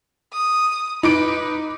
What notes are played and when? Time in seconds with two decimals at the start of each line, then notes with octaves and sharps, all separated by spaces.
0.33 D#6
1.03 D#4 B4 D6 D7